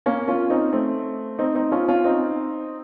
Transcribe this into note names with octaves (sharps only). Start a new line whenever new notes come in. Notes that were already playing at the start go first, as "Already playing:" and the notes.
A#3 C#4
C#4 F4
C4 D#4
A3 C4
C4 D#4
C4 D#4
C#4 F4
C#4 F4
C4 D#4